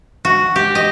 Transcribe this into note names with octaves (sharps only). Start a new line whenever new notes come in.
F#4
G4
D#5